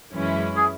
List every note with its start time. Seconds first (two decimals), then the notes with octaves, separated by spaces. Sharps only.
0.12 F#2 E3 G#3 C#4 E4
0.57 G#4